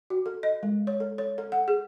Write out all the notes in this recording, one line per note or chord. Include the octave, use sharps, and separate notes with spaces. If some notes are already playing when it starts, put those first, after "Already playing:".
F#4
A4
D#5
G#3
C#5
A4
C#5
A4
F#5
G#4